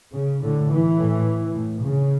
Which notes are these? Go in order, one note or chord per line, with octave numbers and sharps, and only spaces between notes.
C#3
A2 D3
E3
A2
A2
C#3